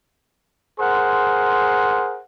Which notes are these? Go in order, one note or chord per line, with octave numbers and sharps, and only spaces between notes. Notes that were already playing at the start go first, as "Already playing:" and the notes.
G#4 A#4 C5 F#5 C6